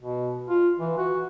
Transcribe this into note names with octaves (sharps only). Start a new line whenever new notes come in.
B2
F4
E3
F#4